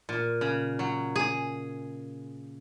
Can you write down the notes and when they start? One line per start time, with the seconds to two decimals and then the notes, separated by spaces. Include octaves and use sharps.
0.09 A#2
0.41 C#3
0.79 F#3
1.16 G#4